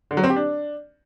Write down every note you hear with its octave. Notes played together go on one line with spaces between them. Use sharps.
D3
F#3
C4
G4
D4